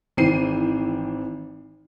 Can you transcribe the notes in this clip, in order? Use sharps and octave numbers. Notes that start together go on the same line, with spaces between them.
G#1 E3 C4 C7 D#7